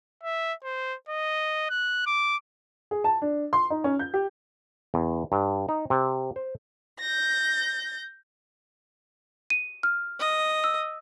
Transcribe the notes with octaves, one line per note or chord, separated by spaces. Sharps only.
E5
C5
D#5
F#6
D6
G#4
A5
D4
C6
D#4
C#4
G6
G4
E2
G2
D#4
C3
C5
G6 A#6
D#7
F6
D#5
E6